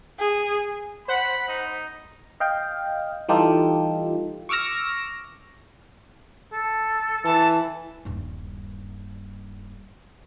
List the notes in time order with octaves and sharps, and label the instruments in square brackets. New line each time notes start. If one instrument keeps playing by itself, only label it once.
[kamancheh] G#4
[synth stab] C5 F#5 [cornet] B5
[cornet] D#4
[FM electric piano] D#5 F5 G5
E3 G3 D#4 F4 G4 A4
C#6 D6 E6 F6 A#6
[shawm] A4
[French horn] E3 [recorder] A5
[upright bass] D#1 G2